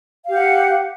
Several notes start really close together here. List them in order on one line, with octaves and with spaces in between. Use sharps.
F5 G4 F#5